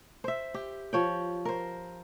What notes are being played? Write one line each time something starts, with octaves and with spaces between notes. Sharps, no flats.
C5 E5
G4
F3 C#5 G5
A#4 C5